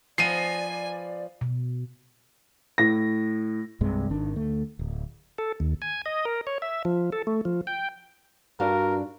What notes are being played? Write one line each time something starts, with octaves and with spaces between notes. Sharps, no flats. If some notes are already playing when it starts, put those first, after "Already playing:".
F3 B3 D5 D#5 G#5 C7 D#7
B2
A2 A#6
C2 G2 C3 G#3
G#1 D#3 D4
D2 A3
D1
A4
D#2
G#5
D#5
A#4
C#5
E5
F3
A4
A3
F3
G5
G2 D4 F#4 A#4 F5